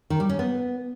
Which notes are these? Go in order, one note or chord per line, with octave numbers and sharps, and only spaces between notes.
D#3
G3
C#4
B3